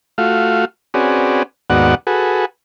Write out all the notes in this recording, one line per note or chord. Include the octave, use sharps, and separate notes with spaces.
A3 F4 F#4 F5
C4 C#4 F#4 G#4 B4 D5
D#2 G#2 B3 F#4 D5 F#5
F#4 G#4 A4 B4